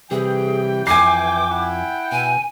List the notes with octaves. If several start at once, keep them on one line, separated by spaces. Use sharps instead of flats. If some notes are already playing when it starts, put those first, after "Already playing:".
C3 E3 G3 G4 G#4 G5
F2 G#5 D6 C7
E4 F#5 G5
B2 G#5